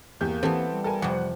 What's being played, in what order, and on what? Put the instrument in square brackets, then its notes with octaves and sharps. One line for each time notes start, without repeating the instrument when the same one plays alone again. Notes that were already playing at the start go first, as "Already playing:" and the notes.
[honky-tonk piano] E2 G4 G6 [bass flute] A#3
[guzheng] E3 B3 [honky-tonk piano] C4 G4 A4
[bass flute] G3
[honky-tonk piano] A4 A#4 G#5
[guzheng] F2 C3 [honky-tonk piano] F#5